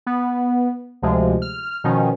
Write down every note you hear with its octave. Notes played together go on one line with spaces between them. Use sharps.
B3
D2 C3 F3 G#3
F6
B2 D#3 F3 C#4